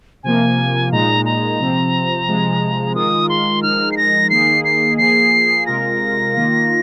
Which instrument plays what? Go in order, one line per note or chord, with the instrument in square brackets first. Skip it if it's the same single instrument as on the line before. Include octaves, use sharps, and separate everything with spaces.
[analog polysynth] C3 F3 A#3 [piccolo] G#5
[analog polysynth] A#2 G#3 D#4 [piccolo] A#5
[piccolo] A#5
[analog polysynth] C3 F3 C4
C3 F3 G#3
[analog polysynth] D#3 G#3 F4 A#4 [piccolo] D#6
[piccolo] C6
[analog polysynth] F3 G#3 D#4 A#4 [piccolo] F6
[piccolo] C7
A#6
[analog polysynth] D#3 A#3 D#4 G#4 [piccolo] C7
[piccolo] C7
[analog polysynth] F3 A#3 G#4 [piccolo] C7
[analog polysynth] C3 G#3 F4 A#4 [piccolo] A#6
[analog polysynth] D#3 A#3 F4